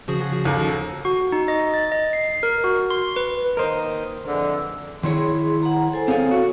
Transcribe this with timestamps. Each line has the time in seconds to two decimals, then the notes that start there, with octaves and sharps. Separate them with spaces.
0.08 C#3 F3 F#4 G#4
0.45 D#2 A4
1.05 F#4
1.32 D#4
1.48 D#5
1.74 A6
1.92 D#5
2.13 C7
2.43 A#4
2.64 F#4
2.90 C6
3.16 B4
3.57 D#3 A#3 A#4 C5 D#5
4.26 F2 D3 E3 G#3
5.03 D#3 E4 G#4 C#5 C6
5.62 F#5 A#5
5.93 A4 C5 G#5
6.08 C4 G#4 A4 C#5 F5
6.31 F#4